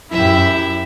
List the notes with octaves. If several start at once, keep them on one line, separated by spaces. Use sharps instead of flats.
F#2 E4 G4 E5